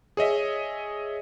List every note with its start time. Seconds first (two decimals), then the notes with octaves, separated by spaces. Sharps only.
0.17 G#4 C#5 D#5 E5